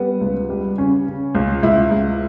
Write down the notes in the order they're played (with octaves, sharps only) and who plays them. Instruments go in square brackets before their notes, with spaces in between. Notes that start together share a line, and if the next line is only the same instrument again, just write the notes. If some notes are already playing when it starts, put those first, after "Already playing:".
Already playing: [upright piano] G3 B3
C#2
G3
C#3 C#4
C#3
C#2
C#2 E4
C#2